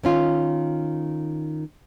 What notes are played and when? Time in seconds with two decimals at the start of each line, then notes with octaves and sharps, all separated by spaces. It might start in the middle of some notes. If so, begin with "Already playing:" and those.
0.04 D#3 C#4 F4